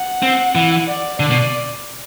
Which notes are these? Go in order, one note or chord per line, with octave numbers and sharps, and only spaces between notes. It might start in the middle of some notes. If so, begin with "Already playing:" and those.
Already playing: F#5
C4
E3
D5
D3 D5
B2